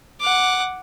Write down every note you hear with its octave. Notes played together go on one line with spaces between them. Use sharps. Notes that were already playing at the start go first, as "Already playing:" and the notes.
F#5 D6